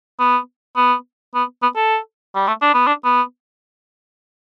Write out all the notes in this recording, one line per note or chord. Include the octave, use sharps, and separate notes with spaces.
B3
B3
B3
B3
A4
G3
A3
D4
B3
D4
B3